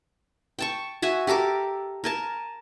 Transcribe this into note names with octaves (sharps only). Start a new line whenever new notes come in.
G5 A5 C#6
F#4 E5 G#5
G4 A4 A#4 D6
A#4 G#5 A5